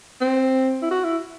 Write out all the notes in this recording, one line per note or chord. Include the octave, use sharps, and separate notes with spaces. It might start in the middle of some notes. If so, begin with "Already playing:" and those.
C4
E4
F#4
E4